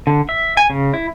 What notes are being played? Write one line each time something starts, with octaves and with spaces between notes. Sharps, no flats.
D3
E5
G#5
C#3
E4